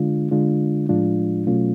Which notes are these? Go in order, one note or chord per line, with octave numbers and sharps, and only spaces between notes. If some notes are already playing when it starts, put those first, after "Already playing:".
Already playing: D3 G#3 D4 F4
D3 G#3 D4 F4
A2 F3 G#3 D4 F4
B2 F#3 A3 C#4 F4